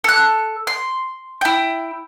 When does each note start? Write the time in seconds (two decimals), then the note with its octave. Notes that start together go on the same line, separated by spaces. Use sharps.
0.04 A4 F#6
0.67 C6
1.41 E4 G5